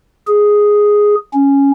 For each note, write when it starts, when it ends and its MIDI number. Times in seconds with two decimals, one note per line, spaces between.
0.27 1.15 68
1.33 1.71 61